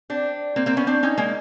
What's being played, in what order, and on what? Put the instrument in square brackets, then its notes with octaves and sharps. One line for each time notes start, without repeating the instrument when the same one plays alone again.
[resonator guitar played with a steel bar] C4 D4
A#3 C4
A#3 C4
B3 C#4
C4 D4
C#4 D#4
G#3 A#3